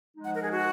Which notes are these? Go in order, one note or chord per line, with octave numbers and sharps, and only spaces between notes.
F3 G#3 D#4
F#5
A#4
G#4
F#4